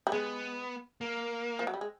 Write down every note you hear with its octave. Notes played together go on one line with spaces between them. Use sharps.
G3
G#3 B3
A#3
F3
F#3
G3
G#3